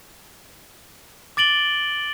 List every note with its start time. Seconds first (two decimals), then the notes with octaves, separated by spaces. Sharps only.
1.37 D6 A6 D7 F#7 G7